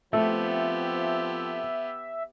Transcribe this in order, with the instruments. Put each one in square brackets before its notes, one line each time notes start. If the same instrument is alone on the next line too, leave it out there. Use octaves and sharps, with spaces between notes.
[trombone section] F3 C4 [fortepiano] A3 [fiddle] B3 G4 [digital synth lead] E5